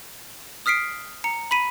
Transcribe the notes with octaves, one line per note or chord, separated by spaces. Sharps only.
D#6 F6 B6 C7 D7
A#5 C#7
B5 B6 D#7